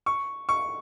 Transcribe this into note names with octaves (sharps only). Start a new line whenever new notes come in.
C#6
C#6